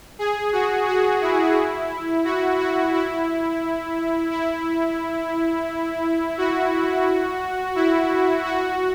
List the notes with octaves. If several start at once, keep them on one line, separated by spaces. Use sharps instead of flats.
G#4
F#4
F#4
E4
F#4
F#4
E4
E4
F#4
E4
F#4